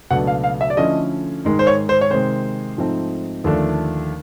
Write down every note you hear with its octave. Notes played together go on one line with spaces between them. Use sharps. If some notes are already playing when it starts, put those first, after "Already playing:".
C#2 B2 F#3 A3 D4 F#5
F5
F5
E5
D5
D3 F3 A3 C#4 E4 D#5
G#2 D#3 G#3
C5
C#5
C5
C#5
C3 D#3 G#3 C5
G#2 F3 A3 C4 D#4
D#2 D3 F3 A3 D4